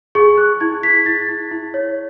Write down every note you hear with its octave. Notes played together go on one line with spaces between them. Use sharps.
G#4 C#6
G#4 F#6
E4 G#6
E4 B6
E4 A6
E4
E4
C#5